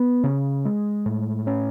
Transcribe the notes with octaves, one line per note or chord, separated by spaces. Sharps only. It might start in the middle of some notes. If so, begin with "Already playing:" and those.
Already playing: B3
C#3
G#3
A2
C#4